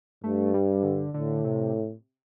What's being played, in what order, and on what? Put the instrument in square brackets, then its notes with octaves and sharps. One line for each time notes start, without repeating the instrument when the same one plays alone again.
[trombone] G2 [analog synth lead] A3
[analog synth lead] G3
D3
[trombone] A2 [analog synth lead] D3
[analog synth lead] C3